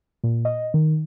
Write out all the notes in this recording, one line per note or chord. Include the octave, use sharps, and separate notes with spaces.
A#2
D#5
D#3